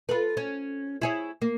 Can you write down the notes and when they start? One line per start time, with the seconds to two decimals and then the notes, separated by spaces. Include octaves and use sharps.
0.09 F4 A4 B4
0.37 C#4
1.01 E4 G#4 C#5
1.42 A#3